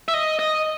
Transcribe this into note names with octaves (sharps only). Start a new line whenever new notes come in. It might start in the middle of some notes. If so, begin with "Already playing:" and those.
E5
D#5
D#5